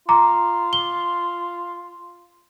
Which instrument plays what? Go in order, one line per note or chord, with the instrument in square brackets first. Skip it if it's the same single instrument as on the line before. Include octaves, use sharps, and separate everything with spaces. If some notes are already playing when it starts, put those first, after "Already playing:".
[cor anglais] F4 [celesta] A#5 D6
[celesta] G7